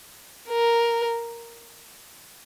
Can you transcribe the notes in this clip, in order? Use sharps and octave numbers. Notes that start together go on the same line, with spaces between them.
A#4